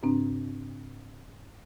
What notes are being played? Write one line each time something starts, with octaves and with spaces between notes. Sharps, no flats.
G#2 C#3 C4 D4